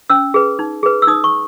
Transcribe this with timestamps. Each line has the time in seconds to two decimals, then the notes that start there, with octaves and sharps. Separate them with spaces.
0.10 C#4 E6
0.34 G#4 B4
0.59 D#4
0.83 G#4 B4
1.02 E6
1.07 D#4 D#6
1.24 C#6